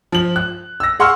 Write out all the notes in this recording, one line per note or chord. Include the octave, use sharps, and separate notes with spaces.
F3 F#7
F#6
E6 A#6
G#4 F#5 C6 C#6 E6 F6